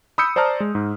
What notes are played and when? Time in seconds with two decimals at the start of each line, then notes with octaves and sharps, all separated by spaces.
0.18 B5 D#6 E6 G6 C#7
0.36 C5 D5 A5 A#5 F6
0.60 G#3
0.75 G#2